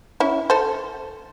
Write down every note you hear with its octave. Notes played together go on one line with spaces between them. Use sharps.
C#4 E4
A4 C5